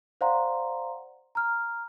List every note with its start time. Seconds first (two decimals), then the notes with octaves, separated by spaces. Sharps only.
0.21 C5 D5 F5 F#5 A#5 C6
1.35 A#5 F6